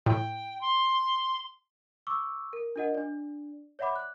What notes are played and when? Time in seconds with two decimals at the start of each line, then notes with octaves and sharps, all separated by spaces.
0.06 A2 G5
0.61 C6
2.07 C#6 D6 E6
2.53 A#4
2.76 D4 F4 A#4 D#5 F#5
2.94 D4 D5
3.79 C#5 D5 E5 F#5 B5 D6
3.96 F#6